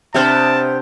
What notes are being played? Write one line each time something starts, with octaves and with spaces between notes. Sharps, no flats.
C3 B3 D4 G4 C5 E5 A5 F6